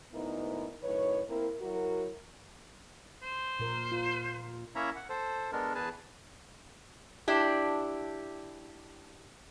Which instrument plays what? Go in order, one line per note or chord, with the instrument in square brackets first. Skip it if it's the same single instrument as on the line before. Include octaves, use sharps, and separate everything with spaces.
[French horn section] D2 G#2 B3 D#4 E4 A#4
F#2 A2 D#3 B4 C#5
A#3 C4 E4 A#4
F#3 E4 F#4 A#4
[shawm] C5
[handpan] A#2 A#4
F4
[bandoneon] A#3 C#4 E4 C#5 E5 A#5
F#5
A4 C5
G#3 B3 D4 A4 A#4
E2 G#4 B4 G#5 A5
[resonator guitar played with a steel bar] D4 E4 G4